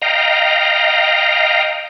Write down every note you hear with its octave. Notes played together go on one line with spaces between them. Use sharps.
D#5 F5 G5 A#5